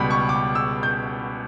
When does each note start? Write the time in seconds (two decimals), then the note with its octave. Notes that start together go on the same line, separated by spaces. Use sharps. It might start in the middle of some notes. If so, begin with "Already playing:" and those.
Already playing: C#2 B2 G3 B5
0.11 C#6
0.29 D6
0.55 E6
0.83 G6